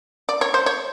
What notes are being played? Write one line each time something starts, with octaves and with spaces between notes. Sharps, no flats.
D5
C#5
C5
C#5